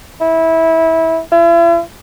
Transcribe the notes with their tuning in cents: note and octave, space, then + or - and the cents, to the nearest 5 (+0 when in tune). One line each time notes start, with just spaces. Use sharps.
E4 -20
E4 +45